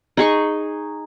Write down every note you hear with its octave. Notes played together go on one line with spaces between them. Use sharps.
D#4 G#4 C#6